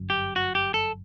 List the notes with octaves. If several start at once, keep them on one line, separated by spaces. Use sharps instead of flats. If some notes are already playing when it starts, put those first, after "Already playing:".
Already playing: G1 F#2
G4
F#4
G4
A4